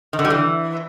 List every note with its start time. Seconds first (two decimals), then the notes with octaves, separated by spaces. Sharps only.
0.13 D#3
0.19 D3
0.25 G3
0.30 E3